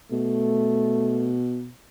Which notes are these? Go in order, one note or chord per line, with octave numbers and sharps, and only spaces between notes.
B2 A3